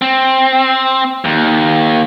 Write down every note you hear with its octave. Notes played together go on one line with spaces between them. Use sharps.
C4
D#2